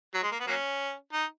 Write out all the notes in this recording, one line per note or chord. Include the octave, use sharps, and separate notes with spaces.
F#3
G#3
A#3
B3
F#3 A#3 C#4
D#4